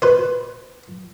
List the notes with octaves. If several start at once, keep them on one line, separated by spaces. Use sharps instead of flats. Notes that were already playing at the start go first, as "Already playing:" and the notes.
B4 C5